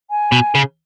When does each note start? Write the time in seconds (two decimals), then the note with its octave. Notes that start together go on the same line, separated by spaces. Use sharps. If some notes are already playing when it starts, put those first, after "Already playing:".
0.10 G#5
0.32 B2
0.55 C#3